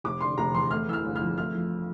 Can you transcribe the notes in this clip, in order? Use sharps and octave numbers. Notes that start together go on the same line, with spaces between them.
F1 D6
D3 C6
F1 A#5
E2 C6
A3 F6
E3 E6 F6
G1
F6
F2
A3 F6
F3